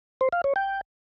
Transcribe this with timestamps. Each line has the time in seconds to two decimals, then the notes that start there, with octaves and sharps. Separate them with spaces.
0.21 C5
0.33 F5
0.44 C#5
0.56 G5